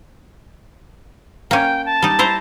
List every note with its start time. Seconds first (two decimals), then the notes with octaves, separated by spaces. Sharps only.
1.51 A#3 C#4 G5
1.86 A5
2.02 G3 D#4
2.19 E4 C5 A#5